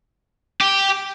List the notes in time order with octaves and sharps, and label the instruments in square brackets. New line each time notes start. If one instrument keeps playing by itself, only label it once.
[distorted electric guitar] G4